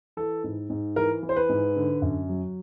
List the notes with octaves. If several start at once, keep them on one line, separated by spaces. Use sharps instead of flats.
E3 A4
G#2
G#2
E3 A#4
E3
C5
B4
G#2
D3
F#2
F#3